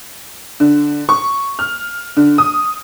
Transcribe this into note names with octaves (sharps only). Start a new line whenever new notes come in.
D3
C#6
F6
D3
D#6